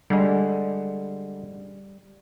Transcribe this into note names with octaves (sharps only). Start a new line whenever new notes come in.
D3 G3 G#3